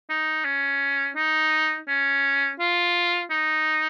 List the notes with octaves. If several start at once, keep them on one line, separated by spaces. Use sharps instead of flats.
D#4
C#4
D#4
C#4
F4
D#4